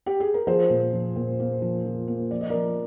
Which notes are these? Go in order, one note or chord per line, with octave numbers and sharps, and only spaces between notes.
G4
G#4
A#4
F3 G#4 C5
A#2
F3
A#2
A#3
F3
F3
A#3
F3 D5
D#5
F3 A#4 D5